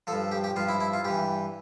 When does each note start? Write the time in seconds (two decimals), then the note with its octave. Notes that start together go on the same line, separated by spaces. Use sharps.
0.07 F3 A4
0.12 G2
0.32 G4
0.44 G4
0.56 G2 F3 F4
0.68 E4
0.81 E4
0.93 F4
1.04 G2 E3 G4